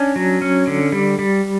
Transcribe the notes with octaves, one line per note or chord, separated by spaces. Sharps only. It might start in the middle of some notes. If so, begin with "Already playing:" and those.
Already playing: C#4 D4
F#3
C#4
D3
G3
G3